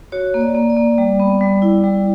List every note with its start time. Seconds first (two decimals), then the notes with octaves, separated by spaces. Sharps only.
0.12 F#4 C#5
0.34 A#3
0.41 D5
0.55 A#3
0.70 D5
0.76 A#3
0.98 G3
1.20 B3
1.41 G3
1.62 E4
1.84 G3